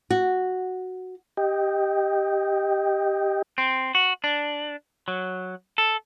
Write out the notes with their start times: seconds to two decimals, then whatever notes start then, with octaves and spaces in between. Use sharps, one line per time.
0.10 F#4
1.37 G4 D#5 G5
3.58 C4
3.95 F#4
4.24 D4
5.08 F#3
5.78 A4